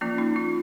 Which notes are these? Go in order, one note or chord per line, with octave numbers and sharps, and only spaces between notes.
F3 A#3 C#4 F4
D#4
F4